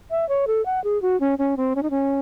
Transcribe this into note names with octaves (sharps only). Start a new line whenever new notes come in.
E5
C#5
A4
F#5
G#4
F#4
C#4
C#4
C4
C#4
D#4
C#4